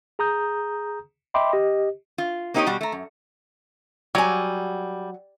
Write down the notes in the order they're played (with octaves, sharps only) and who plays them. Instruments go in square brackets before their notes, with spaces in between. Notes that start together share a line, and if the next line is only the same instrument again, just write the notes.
[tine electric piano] G#4 A#5 D#6 G6
D#5 E5 G5 B5 C6 D6
G4 D#5
[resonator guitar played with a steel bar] F4
A#3 C4 D#4 G4 C#5 D#5
B2 G3 F#4 G4
A3 A#5
F#2
[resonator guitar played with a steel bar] F#3 G#5 [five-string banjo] G3